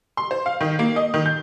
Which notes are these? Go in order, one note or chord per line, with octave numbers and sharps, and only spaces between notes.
C6
C5
F5
D#3
A#3
D#5
D#3
G6